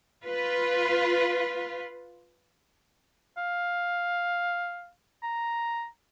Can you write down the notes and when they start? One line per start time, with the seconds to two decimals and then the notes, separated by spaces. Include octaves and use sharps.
0.23 F4 B4
3.37 F5
5.23 A#5